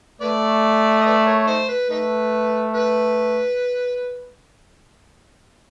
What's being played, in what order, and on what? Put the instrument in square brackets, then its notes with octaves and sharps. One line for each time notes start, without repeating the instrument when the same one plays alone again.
[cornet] A3 [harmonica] B4 D5
[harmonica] D#5
B4 D5
A#4 C#5
D#4 C5
B4
[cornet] A3 [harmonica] D#4 B4
[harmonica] B4